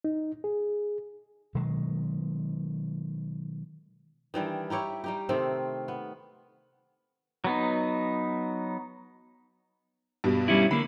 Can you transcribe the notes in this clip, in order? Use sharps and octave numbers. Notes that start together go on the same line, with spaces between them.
D#4
G#4
B2 D#3 F#3 G#3
D#3 E3 G3 D4
D#4 E4 G4 C#5
G3 D#4 G4
C3 D#3 A3 C4
B3
F#3 B3 D#4
G2 B2
G3 C#4 E4
D3 A#3 B5